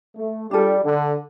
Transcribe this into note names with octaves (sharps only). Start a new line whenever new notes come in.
A3
G3 D4 F4 A4
D3